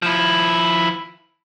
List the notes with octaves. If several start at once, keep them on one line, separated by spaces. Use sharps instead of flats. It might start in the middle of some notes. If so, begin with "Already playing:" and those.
F3 E4